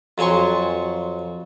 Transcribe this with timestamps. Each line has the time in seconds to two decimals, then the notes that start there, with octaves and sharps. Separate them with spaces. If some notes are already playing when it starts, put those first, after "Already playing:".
0.18 F2 F#3 G#5 C6 C#6